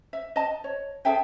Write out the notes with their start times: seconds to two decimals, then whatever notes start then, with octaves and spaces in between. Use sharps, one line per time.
0.13 E5
0.36 D#5 A5
0.64 C#5
1.05 G#4 A4 E5 G5